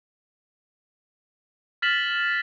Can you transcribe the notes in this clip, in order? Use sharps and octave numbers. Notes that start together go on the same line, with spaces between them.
F6 A6 B6 E7 F#7